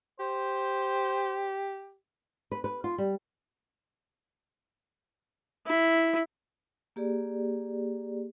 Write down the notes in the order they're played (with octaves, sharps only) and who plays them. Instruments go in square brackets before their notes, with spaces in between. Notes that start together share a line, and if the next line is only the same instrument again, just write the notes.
[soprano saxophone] G4 [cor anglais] C5
[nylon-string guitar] B4
B4
F4
G3
[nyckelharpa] E4
[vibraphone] A#3 G4 G#4 D5